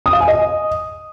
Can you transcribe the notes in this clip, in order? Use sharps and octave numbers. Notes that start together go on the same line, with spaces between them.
D#6
F5
G#5
D#5